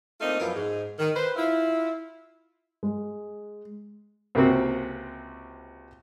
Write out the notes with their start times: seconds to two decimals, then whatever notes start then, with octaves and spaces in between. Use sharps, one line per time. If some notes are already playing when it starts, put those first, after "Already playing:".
0.21 A3 A#3 C4 D4 D#4 F4
0.40 F#2 F3 B3 E4 F4 A#4
0.54 G#2
0.99 D#3
1.15 B4 C5
1.36 E4 F4
2.83 G#3
4.35 C#2 C3 A#3 C4 F#4